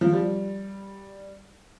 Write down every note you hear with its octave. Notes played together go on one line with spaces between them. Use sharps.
F3
G3